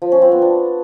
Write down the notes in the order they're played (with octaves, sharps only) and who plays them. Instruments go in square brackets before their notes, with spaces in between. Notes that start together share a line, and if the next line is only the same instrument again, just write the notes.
[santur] F3
C#4
C4
B3
D4